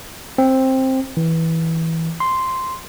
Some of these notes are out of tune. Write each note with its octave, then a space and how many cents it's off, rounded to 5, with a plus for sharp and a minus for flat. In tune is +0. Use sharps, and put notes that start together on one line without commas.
C4 +10
E3 -15
C6 -5